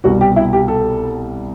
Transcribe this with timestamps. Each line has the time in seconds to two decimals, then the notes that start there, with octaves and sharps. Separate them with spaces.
0.04 C2 B2 G3 F#4
0.21 G4
0.36 E4
0.53 G4
0.68 A4